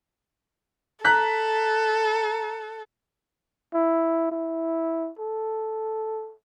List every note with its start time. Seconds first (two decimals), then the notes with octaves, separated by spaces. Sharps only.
1.05 A4 A#5 F#6 B6
3.74 E4
4.31 E4
5.19 A4